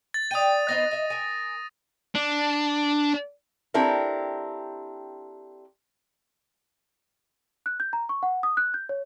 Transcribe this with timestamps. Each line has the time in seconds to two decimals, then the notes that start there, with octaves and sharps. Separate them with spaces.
0.14 A6
0.31 D5 G5 D#6 D#7
0.69 B3 D#4 C5 A#6
0.91 D#5 E5
1.10 A#4 G#5
2.15 D4
3.74 C4 D4 E4 G4 A4 A#4
7.66 F#6
7.80 G6
7.93 A#5
8.09 C#6
8.23 F#5
8.43 D#6
8.57 F#6
8.74 G6
8.89 C#5